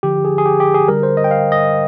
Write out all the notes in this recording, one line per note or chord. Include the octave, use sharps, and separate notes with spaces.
D3 F3 G4
G#4
G#4
G4
G4
G#4
D3 G3 A#4
C5
D#5
G5
F5
D#5